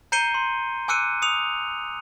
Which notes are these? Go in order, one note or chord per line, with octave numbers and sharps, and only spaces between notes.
A#5 G6 C7 C#7 D#7 G7
C6
G#5 D6 E6 F#6 C#7 D#7
D#6 C#7 F7